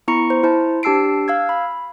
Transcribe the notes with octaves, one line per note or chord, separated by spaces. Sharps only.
B3 E4 A#5 C#6 C#7
C5
E4 C5 A5
D4 G4 A5 E6 C7 D7
F5 E6 G#6
B5